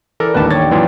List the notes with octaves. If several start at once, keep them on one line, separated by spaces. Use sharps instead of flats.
E3 A4 A#4 D5
A1 D#2 D3 G3 B4 G5 A5
C#5 A6
F#2 A#2 E3 F#3 F4